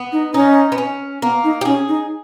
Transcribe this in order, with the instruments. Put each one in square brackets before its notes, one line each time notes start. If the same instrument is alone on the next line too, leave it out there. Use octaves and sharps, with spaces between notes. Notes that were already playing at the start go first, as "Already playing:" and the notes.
Already playing: [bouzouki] B3
[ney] D#4
[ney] C#4 [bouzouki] D#4
[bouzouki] B3
C#4
[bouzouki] A#3 [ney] B3
[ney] D#4
[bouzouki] G4
[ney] C#4 [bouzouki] G#4
[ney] D#4